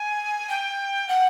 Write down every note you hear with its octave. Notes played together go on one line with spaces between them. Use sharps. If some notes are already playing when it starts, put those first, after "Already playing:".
Already playing: G#5
G5
F#5